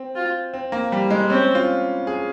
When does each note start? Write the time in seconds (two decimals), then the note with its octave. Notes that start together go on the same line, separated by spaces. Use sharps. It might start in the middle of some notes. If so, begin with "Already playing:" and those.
Already playing: C4
0.16 F4
0.54 C4
0.72 A#3
0.92 G3
1.10 G#3
1.30 C4 C#4
1.55 F4
2.07 G#4